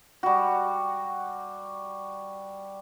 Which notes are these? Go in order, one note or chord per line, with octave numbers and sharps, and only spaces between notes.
G3 F#4